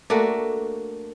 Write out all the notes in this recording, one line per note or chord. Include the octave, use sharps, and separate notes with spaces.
A3 A#3 D4 F#4